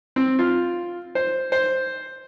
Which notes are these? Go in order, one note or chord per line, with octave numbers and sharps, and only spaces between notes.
C4
F4
C5
C5